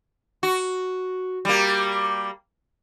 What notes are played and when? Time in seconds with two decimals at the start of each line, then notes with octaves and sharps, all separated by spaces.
0.43 F#4
1.45 G3 A#3